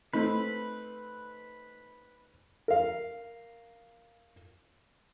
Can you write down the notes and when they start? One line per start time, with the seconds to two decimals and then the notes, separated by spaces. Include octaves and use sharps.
0.14 A3 C4 D#4 B4
2.68 A#4 F5